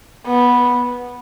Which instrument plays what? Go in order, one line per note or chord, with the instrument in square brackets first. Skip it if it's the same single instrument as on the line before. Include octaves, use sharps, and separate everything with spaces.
[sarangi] B3